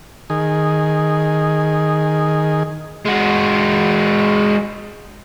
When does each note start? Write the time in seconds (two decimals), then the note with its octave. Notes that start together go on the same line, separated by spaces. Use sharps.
0.30 D#3 G#4
3.05 G#3 F#4